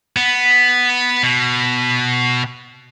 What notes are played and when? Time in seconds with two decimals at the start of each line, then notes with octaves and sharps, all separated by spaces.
0.16 B3
1.23 B2